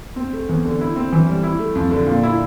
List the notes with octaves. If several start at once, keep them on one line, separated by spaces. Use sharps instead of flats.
C4
A3
E2
D3
E4
C4
E3
G3
E4
A3
F2
D3
A#2
E4